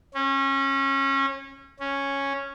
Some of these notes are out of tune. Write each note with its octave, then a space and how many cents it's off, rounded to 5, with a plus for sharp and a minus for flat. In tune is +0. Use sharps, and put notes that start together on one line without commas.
C#4 -25
C#4 -5